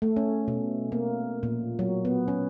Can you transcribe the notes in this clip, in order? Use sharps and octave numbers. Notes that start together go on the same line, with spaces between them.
A3
C#4
B2
A#3
A#2
F#3
B3
C#4